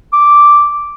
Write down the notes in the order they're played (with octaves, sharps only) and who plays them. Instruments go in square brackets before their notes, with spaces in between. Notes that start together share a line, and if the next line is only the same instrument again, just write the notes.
[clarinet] D6